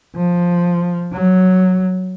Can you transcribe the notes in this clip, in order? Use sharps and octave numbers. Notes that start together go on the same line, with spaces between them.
F3
F#3